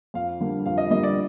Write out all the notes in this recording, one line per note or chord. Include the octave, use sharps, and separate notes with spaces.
F2 F5
D3 G3 A#3
F2 F5
D#5
D3 G3 A#3 D#5
D5